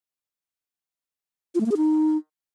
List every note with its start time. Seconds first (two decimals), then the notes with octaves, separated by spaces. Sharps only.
1.55 F4
1.60 A3
1.66 A#3
1.71 G#4
1.77 D#4